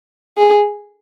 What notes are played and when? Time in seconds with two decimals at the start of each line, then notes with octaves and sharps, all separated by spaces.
0.37 G#4